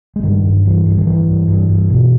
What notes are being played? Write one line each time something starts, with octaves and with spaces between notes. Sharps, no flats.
G#3
G2 D#3 G3
G2
G2 E3
G2
D#3
G2 E3
G2
G2
G2
B2